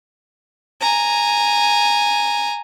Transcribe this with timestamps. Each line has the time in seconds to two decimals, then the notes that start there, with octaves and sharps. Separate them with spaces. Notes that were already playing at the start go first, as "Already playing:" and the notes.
0.81 G#5 A#5